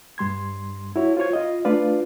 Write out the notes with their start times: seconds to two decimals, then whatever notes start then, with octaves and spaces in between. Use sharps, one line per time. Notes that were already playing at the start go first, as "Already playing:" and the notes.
0.18 G2 G3 C6 G#6
0.96 E4 F#4 C#5
1.17 F4 C5 C#5 G#6
1.33 F4 D#5
1.65 A3 D4 F4 B4 D5 F5